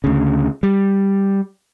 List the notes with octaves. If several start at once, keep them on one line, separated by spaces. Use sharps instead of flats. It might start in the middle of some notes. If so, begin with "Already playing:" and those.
D2 C#3
G3